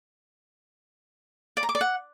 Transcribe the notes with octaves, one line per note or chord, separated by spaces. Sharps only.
D5
A#5
D6
D5
F#5